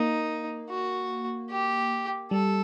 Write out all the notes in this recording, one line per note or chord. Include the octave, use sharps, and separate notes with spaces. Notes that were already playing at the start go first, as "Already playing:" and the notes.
Already playing: A#3 D#4
F#4
G4
G3 A4